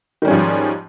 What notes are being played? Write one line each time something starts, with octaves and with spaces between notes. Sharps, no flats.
G#2 D#3 F3 G3 C#4